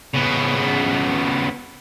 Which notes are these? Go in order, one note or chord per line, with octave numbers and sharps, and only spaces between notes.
C#3 B3